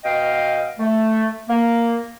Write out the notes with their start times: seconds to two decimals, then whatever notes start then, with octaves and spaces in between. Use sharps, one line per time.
0.04 B2 D#5 F5 G5
0.79 A3
1.48 A#3